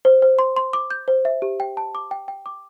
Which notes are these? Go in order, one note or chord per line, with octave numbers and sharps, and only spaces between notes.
C5
C5
C6
C6
D6
G6
C5
E5
G4
G5
A5
D6
G5
G5
D6